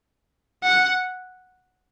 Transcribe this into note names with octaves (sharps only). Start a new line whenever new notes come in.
F#5